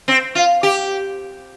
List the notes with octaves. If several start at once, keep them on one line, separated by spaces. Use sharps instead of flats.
C4
F4
G4